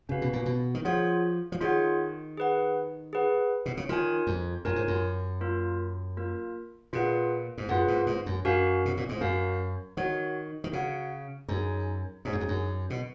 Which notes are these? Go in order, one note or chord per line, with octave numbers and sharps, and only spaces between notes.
C#3 C#4 F#4 B4 F5
B2
A#2
B2
D#3
F3 F4 G#4 C#5 F#5
F3
D#3 F4 G#4 C#5 F#5
G#4 B4 F#5
G#4 B4 F#5
B2
C#3
D#3 F4 A#4 C#5 G#5
F2
F#2 F4 A#4 C#5 G#5
G#2
F#2
A#3 F4 A#4
A#3 F4 A#4
A#2 F4 G#4 B4 F#5
G#2
F#2 F4 G#4 B4 F#5
G#2
G#2
F#2
F#2 C#4 F#4 A#4 F5
B2
A#2
G#2
F#2 C#4 F#4 A#4 F5
D#3 F#4 C#5 F#5
D#3
C#3 F#4 C#5 F#5
F#2 D#4 G#4 C#5 G#5
G#2 D#4 G#4 C#5 G#5
F#2
F2
F#2
B2